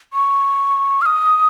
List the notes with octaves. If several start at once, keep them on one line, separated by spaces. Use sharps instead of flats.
C#6
F6
D#6